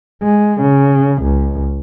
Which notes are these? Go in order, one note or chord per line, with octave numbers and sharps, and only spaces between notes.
G#3
C#3
C#2